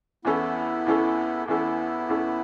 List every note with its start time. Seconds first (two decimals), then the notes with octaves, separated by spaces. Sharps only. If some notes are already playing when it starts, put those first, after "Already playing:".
0.25 E2 E3 B3 C#4 E4 A4
0.86 E2 E3 C#4 A4
1.47 E2 E3 B3 C#4 E4 A4
2.09 E2 E3 C#4 A4